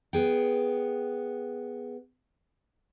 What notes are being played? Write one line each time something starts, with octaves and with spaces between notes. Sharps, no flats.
B3 G#4 G5